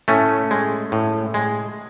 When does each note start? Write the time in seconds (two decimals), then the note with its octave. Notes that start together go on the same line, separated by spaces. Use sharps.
0.08 A2 A3 C#4
0.51 G#3
0.92 A2
1.34 G#3